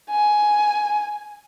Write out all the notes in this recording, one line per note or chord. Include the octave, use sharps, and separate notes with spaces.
G#5